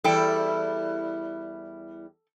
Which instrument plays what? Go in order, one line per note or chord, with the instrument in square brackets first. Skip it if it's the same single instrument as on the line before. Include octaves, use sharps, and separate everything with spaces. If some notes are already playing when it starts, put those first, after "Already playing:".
[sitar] E2 G3 E4 [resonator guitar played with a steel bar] A4 G5